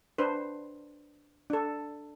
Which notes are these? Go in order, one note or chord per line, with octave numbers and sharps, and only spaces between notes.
D4 B4 C5
D4 A4